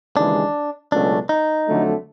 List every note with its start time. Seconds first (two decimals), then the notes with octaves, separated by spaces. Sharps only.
0.16 D#2 C#3 E3 G#3 D4
0.92 C#2 B2 F#3 A3 C#4 D4
1.29 D#4
1.67 F2 D3 F#3 A3